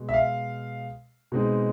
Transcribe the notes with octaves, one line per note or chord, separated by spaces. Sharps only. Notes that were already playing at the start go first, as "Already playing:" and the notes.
Already playing: B2 G#3
E5
F5
B2 G#3 C4 D#4